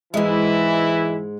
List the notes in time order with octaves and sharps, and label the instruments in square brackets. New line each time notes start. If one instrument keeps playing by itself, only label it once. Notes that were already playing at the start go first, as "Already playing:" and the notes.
[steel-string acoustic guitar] G#2 G#3 [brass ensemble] E3 E4 [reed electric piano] G#4 D#5 E5